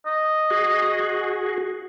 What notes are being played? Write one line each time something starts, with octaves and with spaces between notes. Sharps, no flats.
D#5
F#4 G#4